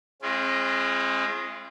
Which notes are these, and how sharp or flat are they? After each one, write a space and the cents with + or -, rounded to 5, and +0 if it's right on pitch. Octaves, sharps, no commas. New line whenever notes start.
G#3 +0 C4 +40 F4 -45